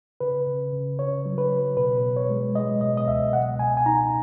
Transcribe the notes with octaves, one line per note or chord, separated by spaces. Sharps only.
C#3 B4
C#3
C#3
C#3 C#5
F#3
B4
F#3
B2 B4
B2
C#5
G#3
G#3 D#5
B2 D#5
D#5
C#2 E5
B2 F#5
B2 G#5
G#5
D#4 A#5